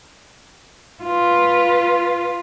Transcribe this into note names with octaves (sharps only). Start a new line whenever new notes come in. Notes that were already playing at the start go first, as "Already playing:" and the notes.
F4 B4